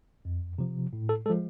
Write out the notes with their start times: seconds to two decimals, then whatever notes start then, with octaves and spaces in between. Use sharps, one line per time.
0.25 F2
0.58 C3 F3
0.93 A2
1.09 A4
1.26 G#3 A4
1.30 F3